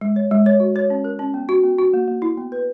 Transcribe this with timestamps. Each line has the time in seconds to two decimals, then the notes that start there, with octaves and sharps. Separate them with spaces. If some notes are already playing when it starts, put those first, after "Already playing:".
0.01 G#3
0.16 C#5
0.31 G#3
0.46 C#5
0.60 F#4
0.76 C#5
0.90 C#4
1.04 A#4
1.19 C#4
1.34 B3
1.49 F#4
1.64 B3
1.79 F#4
1.94 A#3
2.08 A#3
2.22 E4
2.37 B3
2.52 B4